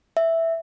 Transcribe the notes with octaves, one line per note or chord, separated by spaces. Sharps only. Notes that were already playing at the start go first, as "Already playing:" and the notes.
E5